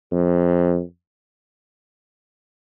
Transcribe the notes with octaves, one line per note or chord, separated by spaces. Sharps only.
F2